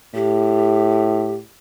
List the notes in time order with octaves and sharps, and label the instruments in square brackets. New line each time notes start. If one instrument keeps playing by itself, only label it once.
[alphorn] A2 [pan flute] G4